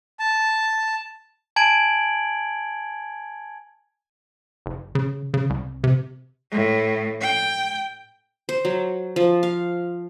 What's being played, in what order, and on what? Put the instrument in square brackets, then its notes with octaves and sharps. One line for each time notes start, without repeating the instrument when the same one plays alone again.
[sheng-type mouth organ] A5
[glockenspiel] G#5 A5 G#6 D7 F#7
[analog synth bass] F#1
C#3
C#3
C2
C3
[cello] A2
G5
[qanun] C5
F#3
F3
F5